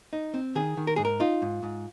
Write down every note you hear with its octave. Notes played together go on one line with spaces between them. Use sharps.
D#4
C4
D#3 G#4
D#3
A#4
G#2 G#4
A#4
D#4 F4
G#2
G#2